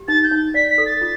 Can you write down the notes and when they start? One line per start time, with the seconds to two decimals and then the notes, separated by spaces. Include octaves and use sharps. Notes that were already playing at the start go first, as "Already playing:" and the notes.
Already playing: G4
0.08 D#4 A6
0.24 G6
0.31 D#4
0.54 D5 B6
0.70 B6
0.78 A4
0.86 A6
1.01 F4